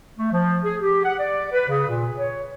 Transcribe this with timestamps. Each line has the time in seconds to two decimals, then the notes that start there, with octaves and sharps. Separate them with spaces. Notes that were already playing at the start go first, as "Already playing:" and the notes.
0.17 A3
0.32 F3
0.64 G#4
0.81 G4
1.05 F#5
1.19 D5
1.52 B4
1.68 C#3
1.88 A#2
2.17 C#5